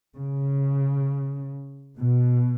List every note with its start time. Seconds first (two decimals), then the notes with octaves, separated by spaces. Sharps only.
0.17 C#3
1.98 B2